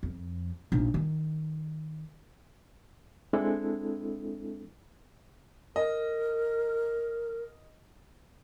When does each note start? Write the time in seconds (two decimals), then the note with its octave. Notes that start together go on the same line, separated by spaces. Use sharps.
0.03 F2
0.72 A#1 D#4
0.94 D#3
3.33 G#3 C4 D4 E4 A4
5.76 A#4 D#5